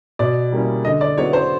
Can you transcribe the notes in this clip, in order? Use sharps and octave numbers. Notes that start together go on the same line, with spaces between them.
B2 D5
G3 A#3 C#4 E4
D3 D#5
D5
F#3 B3 E4 C#5
C5